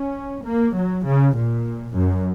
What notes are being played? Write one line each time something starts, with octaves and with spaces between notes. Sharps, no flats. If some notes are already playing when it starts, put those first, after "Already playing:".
Already playing: C#4
A#3
F#3
C#3
A#2
F#2